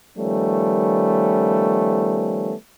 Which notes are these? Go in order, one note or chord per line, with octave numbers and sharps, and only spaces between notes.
D#3 F3 G3 A3 B3 C#4